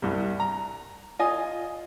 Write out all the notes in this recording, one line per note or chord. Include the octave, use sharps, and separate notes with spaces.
C2 G2
A#5
F4 D#5 G#5 D#6